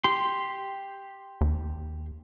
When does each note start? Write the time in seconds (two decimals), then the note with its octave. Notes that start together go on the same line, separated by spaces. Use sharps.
0.04 G4 C6
1.41 D#2